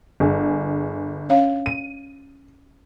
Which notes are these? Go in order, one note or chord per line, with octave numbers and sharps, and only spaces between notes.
G1 G#4
C#4 C#5 F5
D#7